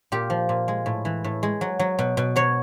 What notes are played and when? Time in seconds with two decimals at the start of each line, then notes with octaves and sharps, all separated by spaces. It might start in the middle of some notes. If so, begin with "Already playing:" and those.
0.12 A#2 G4
0.30 F3
0.49 A#2
0.68 G#3
0.86 A2
1.05 E3
1.24 A2
1.43 G#3
1.61 F#3
1.79 F#3
1.99 B2
2.17 B2
2.36 F#3 C#5